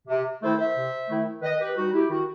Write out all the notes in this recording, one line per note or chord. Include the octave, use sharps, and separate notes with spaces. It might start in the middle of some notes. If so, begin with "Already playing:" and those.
C3
D#3 A3 E4 A4 C5
C5 E5
C3
D#3 A3 E4
D#3 B4 D#5
G4 B4
G3 D#4 F#4
E4 G4
D#3 F#4